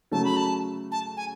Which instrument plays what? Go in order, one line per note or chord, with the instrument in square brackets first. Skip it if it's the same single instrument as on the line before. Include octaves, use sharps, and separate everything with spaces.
[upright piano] C#3 F#3 A3 [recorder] A5
[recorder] B5
A5
A5
G#5